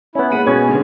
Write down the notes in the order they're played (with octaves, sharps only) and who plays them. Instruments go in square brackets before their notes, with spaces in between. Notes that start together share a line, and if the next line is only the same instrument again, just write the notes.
[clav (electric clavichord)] B3 C#4 [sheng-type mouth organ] E4
[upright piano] D#2 G#3 D#7 [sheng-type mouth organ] F#5 B5
[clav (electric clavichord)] B2 B3 C#4 [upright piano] A#3 G#6 [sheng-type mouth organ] G#4
[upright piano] G#2 D3